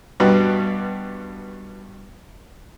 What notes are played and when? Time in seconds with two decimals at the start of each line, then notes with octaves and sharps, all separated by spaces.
0.20 G2 B2 G3 B3